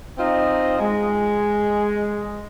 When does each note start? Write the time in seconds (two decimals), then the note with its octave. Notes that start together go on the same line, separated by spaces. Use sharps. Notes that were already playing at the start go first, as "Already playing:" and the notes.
0.18 C4 D#4 F4 C5 D#5
0.80 G#3